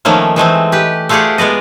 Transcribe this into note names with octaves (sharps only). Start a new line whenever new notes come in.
D#3 F3 A3 A#3 C#4
E3 G#3 A3 C4
G4 B4
A3 F4 G4 G#4 D5 F#5
G#3 B3 D5 D#5